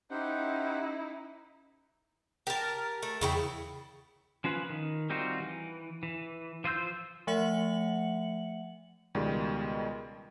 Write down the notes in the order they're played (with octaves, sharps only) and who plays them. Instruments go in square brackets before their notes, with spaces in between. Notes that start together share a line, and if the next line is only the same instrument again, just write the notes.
[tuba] C#4 [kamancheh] D#4 E4 [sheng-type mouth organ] G4 C5 F#5
[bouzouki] G4 A5 [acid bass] A#4
[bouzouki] A3
[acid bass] E2 [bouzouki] C#3 E4 G5
[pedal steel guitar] F3 C#4 F4 B4 B5
D#3
G3 C4 D#4 F4 F#4
E3
E3
F3 F4 C5 E6 G6
[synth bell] F3 A3 E5 F#5 C#7 F#7
[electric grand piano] C#2 B2 D#3 G3 G#3